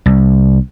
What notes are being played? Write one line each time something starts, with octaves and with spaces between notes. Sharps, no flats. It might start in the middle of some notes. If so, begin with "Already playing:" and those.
C2